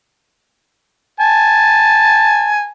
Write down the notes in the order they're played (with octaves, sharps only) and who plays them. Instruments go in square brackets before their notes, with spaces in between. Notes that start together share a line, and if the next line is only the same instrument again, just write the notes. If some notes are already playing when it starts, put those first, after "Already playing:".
[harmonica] G#5 A5